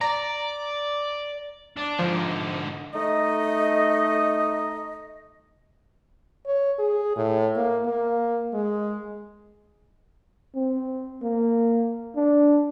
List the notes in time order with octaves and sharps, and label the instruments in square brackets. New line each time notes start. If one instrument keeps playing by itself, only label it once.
[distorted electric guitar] D5 [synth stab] A#5
[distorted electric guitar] D4
[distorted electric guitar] G#2 D3 [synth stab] F3
[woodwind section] A3 D#4 D#5
[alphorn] C#5
G#4
A2
A#3
A#3
G#3
[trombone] C4
A#3
D4